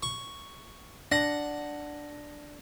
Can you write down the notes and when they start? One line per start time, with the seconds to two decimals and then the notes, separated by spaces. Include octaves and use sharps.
0.03 C#6
1.12 D4 F#5 A#6